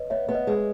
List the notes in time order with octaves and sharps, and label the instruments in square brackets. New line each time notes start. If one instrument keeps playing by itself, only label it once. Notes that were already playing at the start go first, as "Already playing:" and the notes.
Already playing: [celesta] B4 C#5 D#5
[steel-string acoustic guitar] B3 [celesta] C#5 E5
[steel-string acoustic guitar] B3
[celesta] B4 D#5
[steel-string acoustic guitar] G#3